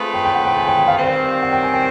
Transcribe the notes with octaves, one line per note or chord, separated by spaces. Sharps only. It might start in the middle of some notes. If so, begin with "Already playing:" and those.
Already playing: A3 C4 F4 G#4 B4
G5
G5
F#5
G5
G#5
G5
G5
F5
D#3 G3 C4
F#5
G5
G#5
G5